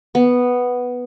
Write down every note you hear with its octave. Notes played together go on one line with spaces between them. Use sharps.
B3